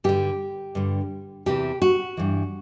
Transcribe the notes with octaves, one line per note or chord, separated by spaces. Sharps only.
G2 D3 G4
G2 D3
E2 C3 E3 G4
F#4
G2 E3